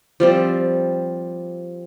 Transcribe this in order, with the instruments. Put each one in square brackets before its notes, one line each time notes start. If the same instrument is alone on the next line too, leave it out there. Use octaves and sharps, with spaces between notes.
[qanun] F3 G3 C4